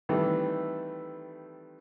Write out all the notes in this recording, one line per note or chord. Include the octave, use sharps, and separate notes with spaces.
D#3 E3 G3 A3 C4